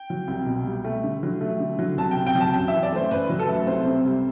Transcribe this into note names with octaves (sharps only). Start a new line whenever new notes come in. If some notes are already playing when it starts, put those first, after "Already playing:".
Already playing: G5
F#3
C2
B2
G3
A3
D3
F#3
A3
D3
F#3
C2 A5
G5
C3
G5
F#3 A5
F#2 G5
E3 E5
D5
A3 C5
F#2 B4
F#3
A4
A3
C2 C5
C3
G3